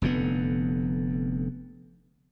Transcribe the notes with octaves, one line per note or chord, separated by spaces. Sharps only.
F1 F2 D3 B3